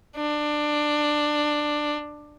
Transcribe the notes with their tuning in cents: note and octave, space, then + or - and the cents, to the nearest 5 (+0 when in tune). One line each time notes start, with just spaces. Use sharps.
D4 +15